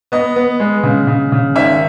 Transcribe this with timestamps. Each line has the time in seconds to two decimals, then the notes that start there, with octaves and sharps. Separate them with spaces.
0.12 B3 D#5
0.36 B3
0.60 G#3
0.83 C#3
1.07 C#3
1.32 C#3
1.55 G#1 E5